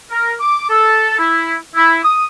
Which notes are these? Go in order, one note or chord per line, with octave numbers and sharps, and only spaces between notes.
A#4
D6
A4
E4
E4
D#6